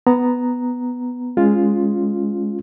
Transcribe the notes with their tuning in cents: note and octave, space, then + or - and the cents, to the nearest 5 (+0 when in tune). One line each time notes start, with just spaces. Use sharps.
B3 +5 A#5 +0
G#3 +0 C#4 +0 F4 +0